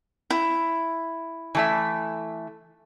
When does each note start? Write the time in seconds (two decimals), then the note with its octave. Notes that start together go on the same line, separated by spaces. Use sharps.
0.30 E4
1.55 E3 A3 E5